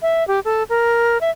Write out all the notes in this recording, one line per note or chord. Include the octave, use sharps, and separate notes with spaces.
E5
G4
A4
A#4
E5